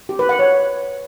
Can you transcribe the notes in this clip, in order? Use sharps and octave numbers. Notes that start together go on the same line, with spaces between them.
G4
B4
F#5
C#5